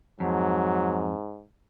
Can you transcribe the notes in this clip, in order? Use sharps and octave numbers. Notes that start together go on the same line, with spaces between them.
F2 G#2 F#3